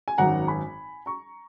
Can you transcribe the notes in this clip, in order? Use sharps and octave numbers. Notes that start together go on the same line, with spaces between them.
G#5
G#1 F#2 D#3 F#5 A#5
G#5 B5
A#5 C#6